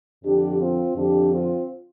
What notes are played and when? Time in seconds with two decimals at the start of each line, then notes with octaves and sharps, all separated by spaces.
0.23 F2 D3 F3 D4 G4
0.59 C4 F4
0.95 F2 D3 F3 D4 G4
1.31 C4 F4